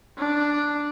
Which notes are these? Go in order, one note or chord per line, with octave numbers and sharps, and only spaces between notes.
D4